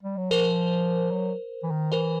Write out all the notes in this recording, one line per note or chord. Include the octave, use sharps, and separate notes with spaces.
G3
F#3
F3 A#4 C5
F#3
E3
D#3
E3 A#4 C5